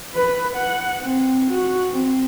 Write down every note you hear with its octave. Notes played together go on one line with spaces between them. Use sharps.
B4
F#5
C4
F#4
C4